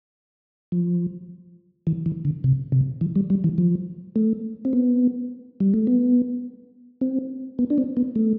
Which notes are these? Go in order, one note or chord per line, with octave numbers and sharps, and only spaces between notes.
F3
E3
E3
D3
C3
C3
E3
G3
G3
E3
F3
A3
C4
B3
G3
A3
B3
C4
B3
D4
C4
B3
A3